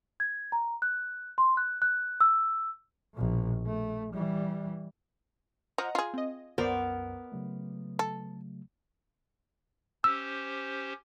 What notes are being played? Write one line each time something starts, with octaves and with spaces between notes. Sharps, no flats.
G#6
A#5
F#6
C6
F#6
F#6
E6
A#1 B2
A3
E3 G3
F3 D#5 F#5 A#5
F4 G#4
C4 D#5
C2 F#2 B3 A#4 C5 D5
C#3 F#3 A3
A4
C#4 G4 C5 E6